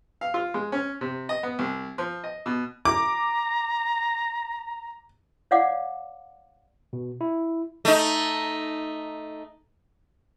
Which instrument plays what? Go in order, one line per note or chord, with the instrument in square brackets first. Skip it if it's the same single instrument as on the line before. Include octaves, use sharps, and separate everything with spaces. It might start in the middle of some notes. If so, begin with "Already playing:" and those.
[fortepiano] F5
F4
G#3
C#4
C3
D#5
B3
C2
F3
D#5
B2
[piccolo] A#5 [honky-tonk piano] D6
[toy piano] C#5 D5 F5 F#5 D6
[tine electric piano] B2
E4
[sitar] A3 D#4